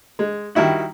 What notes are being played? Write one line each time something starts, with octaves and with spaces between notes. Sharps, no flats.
G#3
D#3 G3 E4 F#4